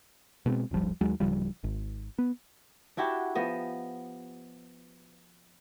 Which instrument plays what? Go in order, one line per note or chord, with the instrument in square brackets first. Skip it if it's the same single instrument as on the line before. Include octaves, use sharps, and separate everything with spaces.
[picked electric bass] B2 G#3 A#3 C4
D#1 G#1 F3 G3
D#2 F#3 G#3
D1 C#3 F3 G3
G#1
B3
[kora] D4 E4 F#4 G4
F3 B3 D#5 E5